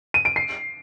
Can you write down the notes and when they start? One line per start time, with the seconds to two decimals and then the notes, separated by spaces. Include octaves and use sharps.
0.14 D#7
0.25 D7
0.36 C7